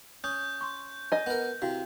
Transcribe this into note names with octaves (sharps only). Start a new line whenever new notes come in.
C#4 D#6 G6
C6 C#6
D#5 G#5
B3 A#4
C3 E4 F#4 F5